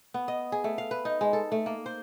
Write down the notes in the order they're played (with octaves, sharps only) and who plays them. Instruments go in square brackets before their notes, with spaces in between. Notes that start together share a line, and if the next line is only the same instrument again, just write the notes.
[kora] B3
D#5
G#4
A3
F5
B4
D#4
G#3
A4
A3
A#3
C5